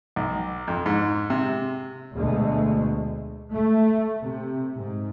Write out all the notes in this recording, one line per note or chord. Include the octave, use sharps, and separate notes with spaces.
B1
F2
G#2
C3
D2 B2 G#3 A3
A3
C3
G#2